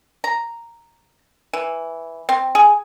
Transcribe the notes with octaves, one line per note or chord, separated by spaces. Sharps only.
A#5
E3
C4
G#4